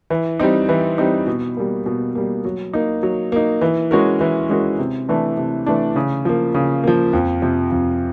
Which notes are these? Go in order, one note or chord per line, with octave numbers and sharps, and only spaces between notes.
E3
G3 C4 D#4
E3
G3 C4 D#4
B2
G3 A#3
B2
G3 A#3
F#3
A#3 D#4
F#3
A#3 D#4
E3
G#3 C#4 F#4 A#4
E3
G#3 C#4 F#4 A#4
C3
E3 A3 D4
C3
E3 A3 D4
C#3
F3 A#3
C#3
F3 A#3
F2
C3 F3
F2